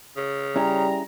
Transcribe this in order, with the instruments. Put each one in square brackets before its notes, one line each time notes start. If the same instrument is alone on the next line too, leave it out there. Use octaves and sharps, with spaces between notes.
[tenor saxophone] C#3
[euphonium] G3 [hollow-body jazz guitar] C#4 E4 G#4 [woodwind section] A#5